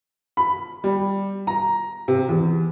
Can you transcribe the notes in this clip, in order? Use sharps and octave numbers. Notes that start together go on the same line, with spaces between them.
B5
G3
A#5
C3
E2